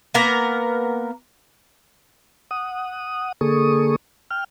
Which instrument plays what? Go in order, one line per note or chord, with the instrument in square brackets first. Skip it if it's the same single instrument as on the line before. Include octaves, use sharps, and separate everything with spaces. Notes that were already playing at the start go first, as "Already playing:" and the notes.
[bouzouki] A#3 B3 A#4 A#5
[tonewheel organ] F#5 D#6
D3 A#3 G#4 A4 C#6 D#6
G5 F6